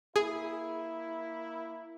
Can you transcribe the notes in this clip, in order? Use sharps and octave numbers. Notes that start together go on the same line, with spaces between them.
A#3 E4 G#4